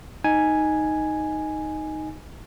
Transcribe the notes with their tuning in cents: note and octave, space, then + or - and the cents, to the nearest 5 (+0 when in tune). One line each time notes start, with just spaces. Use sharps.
D#4 +0 G#5 +0